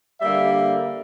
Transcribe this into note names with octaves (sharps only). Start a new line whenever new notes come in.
D3 G3 A#3 E5